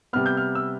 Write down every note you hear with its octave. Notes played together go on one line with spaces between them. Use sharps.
C3 G3 B3 F6
G6
F6
E6